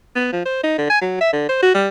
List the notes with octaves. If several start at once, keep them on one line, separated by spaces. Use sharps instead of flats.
B3
F3
C5
D#4
D3
G#5
F#3
E5
D3
C5
F#4
G3